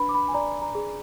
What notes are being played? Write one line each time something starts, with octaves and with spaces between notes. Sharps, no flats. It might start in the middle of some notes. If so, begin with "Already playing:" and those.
Already playing: D4 B4 B5
D6
B5
G#5
D5 A#5
A#5
G#4